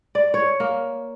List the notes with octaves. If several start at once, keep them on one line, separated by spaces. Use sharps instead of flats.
D5
C#5
A#3